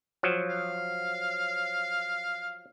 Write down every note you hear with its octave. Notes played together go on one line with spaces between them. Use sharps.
F3 F#3
F5